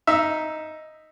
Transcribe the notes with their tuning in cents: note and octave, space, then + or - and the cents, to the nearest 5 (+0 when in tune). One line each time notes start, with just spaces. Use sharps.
D#4 +5 E5 +0